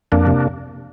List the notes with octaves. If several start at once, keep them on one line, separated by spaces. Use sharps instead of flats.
F2 A#3 D4
C3